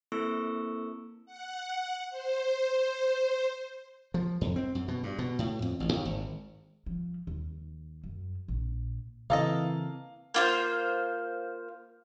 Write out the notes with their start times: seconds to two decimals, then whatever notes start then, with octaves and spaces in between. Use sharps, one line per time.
0.12 A#3 C4 E4 A4 C#6 E6
1.26 F#5
2.09 C5
4.14 F3
4.41 F2
4.56 C4
4.75 F#2
4.88 B2
5.03 G2
5.19 B2
5.39 A2
5.62 F2
5.80 A1
5.93 D#2
6.05 G#1
6.86 F3
7.27 D#2
8.04 F#2
8.48 A#1
9.30 C#3 E3 A#3 C4 A4 D#5 F5
10.34 A#3 F4 C5